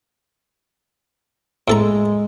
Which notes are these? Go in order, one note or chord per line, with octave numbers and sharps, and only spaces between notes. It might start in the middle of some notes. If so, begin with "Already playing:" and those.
A2 G#3 A4 A#5